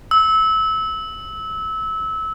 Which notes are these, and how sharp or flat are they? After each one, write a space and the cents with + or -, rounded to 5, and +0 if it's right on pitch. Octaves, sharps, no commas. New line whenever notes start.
E6 -25